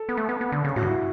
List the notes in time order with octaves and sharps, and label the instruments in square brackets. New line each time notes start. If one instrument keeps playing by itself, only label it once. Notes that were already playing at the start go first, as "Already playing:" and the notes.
Already playing: [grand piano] A4
[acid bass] B3
A3
B3
B3
D3
C#3
[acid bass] A2 [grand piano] F#4
[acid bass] G2
[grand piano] E4